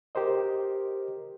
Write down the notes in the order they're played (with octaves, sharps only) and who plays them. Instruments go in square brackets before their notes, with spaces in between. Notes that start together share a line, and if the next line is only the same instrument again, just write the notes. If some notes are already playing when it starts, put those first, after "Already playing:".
[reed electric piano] G4 A#4 C5 D#5